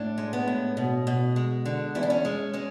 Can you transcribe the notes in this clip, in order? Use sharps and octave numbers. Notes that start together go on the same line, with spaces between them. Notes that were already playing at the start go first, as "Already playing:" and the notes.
Already playing: A2 D4
G#3
B3
A2
B2
B2
G#3
D3 D4
E2 E4
D4
C#4
G#3
G#3 C#4